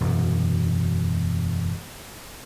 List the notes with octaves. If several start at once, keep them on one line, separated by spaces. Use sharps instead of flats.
E1 F#2